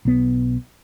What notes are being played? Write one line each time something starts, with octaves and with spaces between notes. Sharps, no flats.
B1 B3